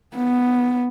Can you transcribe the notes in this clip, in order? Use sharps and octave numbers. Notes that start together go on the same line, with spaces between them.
B3